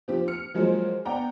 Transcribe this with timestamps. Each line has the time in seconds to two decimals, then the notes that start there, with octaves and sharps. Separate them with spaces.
0.08 F3 C4 G4
0.28 F6 C#7
0.54 F3 F#3 G#3 A#3 A#4 C5
1.05 B3 D5 F#5 G5 A#5